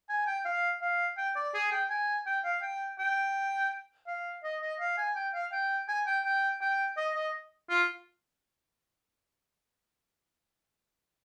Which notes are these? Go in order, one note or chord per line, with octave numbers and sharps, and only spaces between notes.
G#5
G5
F5
F5
G5
D5
G#4
G5
G#5
G5
F5
G5
G5
F5
D#5
D#5
F5
G#5
G5
F5
G5
G#5
G5
G5
G5
D#5
D#5
F4